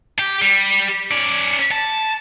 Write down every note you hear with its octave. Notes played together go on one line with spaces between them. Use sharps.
G4
G3
C#4 D5
A5